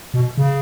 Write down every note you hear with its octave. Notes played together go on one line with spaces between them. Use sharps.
B2
C#3